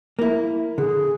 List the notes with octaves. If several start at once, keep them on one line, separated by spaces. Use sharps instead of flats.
A#3 E4
D3 G#4